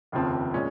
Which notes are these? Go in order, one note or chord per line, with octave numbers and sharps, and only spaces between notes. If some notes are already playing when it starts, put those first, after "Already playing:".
F1 D#2 C#3 F3 C4
A#2 G#3 C#4